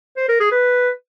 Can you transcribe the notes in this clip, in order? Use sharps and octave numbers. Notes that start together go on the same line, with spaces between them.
C5
A#4
G#4
B4